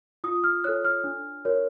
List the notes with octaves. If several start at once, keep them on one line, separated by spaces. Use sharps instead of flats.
F4 D#6
F6
A4 C#5 F#6
F6
D4
F#4 A#4 C#5